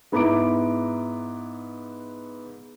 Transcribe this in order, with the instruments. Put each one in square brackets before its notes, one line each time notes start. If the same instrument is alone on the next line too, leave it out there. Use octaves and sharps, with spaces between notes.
[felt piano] G#2 B3 E4 A#5 D6 D7